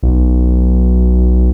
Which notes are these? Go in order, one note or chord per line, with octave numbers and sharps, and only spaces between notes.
B1